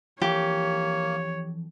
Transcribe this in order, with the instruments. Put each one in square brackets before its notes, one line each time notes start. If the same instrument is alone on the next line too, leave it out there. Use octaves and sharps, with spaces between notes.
[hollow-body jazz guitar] F2 E3 C5 [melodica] A#3 [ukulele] G4 [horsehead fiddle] C#5